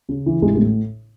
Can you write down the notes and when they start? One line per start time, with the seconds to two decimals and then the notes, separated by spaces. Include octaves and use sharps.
0.09 C#3
0.26 E3
0.42 A1 G#3
0.55 G#3
0.59 A2